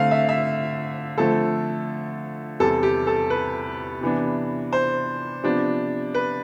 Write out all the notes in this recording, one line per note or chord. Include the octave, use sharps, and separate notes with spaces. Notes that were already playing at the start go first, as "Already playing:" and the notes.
Already playing: D3 A3 C4 F5
E5
E5
D3 F3 A3 C4 A4
E2 C3 G3 A4
G4
A4
B4
C3 E3 B3 D4
C5
C3 F3 B3 D4
B4